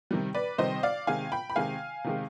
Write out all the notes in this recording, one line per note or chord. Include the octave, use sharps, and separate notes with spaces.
C3 D#3 G3
B4 D5
C3 D#3 G3 C5 D#5
D5 F5
C3 D#3 G#3 F5 G#5
G5 B5
B5
C3 D#3 G#3 F5 G#5
C3 D#3 G#3